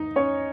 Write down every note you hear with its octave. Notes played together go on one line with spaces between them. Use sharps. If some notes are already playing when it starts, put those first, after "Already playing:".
Already playing: D#4 D#5
C#4 C#5